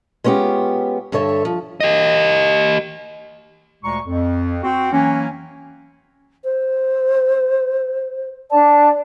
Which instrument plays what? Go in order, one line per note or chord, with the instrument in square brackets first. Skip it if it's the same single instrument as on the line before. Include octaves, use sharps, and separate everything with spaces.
[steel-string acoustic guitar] G#3 B3 C#4 F4 G4
G2 D3 A4 C#5 E5
F3
[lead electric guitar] G4 D#5
[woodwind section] D2 A#2 G#3 A#5 C#6
F2
C4 F#4
E3 F#3 A#3 C#4
[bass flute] C5
[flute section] D4 A5 [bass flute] D5